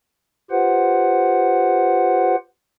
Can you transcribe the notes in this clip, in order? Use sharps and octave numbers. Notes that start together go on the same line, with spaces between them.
F4 G4 B4 C5 F#5